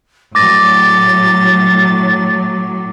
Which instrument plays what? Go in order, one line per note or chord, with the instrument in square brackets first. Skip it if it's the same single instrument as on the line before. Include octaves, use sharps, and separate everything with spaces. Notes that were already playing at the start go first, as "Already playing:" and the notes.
[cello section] A2 F#3 [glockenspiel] D6 A#6 [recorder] A6